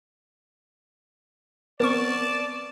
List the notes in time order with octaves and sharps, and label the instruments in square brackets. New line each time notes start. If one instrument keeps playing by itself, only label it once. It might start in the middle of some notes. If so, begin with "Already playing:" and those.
[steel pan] B3 C4 [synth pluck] A#4 C#6 [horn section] D5 [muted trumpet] A5